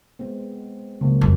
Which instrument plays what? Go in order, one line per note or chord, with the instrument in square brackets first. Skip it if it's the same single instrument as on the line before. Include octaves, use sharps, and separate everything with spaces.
[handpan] G#3 B3 C4
[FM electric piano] C#2 [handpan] F#3 A#3 C4
[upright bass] F2